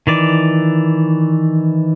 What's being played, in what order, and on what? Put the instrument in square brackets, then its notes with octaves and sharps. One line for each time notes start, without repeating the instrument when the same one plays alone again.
[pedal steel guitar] D#3 E3 D5